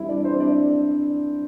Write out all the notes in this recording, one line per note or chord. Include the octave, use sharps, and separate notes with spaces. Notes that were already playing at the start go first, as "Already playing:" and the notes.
Already playing: G2 E3 G3 C4 E4 E5
D4 D5
C4 C5
D4 D5